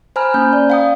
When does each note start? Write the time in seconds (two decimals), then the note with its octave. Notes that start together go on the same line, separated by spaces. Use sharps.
0.16 C5 G#5 A#5 B5 F6
0.34 A#3 C#4 G6
0.53 D5
0.70 F5 G5 D#6